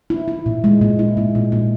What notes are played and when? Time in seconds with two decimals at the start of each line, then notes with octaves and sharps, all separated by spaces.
0.10 E4
0.28 E4
0.46 A#2
0.64 G#3
0.81 A#2
0.99 E4
1.17 A#2
1.35 A#2
1.52 A#2